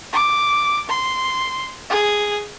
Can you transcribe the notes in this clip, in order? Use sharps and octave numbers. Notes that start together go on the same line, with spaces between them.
D6
C6
G#4